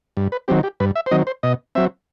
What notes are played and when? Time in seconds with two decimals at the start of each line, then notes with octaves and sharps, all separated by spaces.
0.17 G2
0.32 B4
0.48 D#3 F#3 C4 G4
0.63 G4
0.80 G2 B4
0.96 E5
1.06 C5
1.11 D#3 F#3 C4 D#5
1.27 C5
1.43 B2 D#5
1.75 F#3 C4 E5